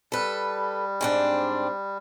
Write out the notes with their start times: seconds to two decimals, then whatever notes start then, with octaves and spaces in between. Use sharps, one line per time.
0.12 G3 A4 B4
1.01 G#2 C4 D4